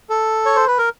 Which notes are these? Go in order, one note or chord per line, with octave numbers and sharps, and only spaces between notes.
A4
C#5
C5
B4
A#4